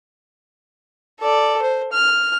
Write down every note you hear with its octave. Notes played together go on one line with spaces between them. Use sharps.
A4 D5
C5
F6